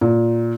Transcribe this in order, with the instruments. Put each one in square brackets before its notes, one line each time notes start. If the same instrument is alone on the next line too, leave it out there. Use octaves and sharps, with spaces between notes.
[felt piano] A#2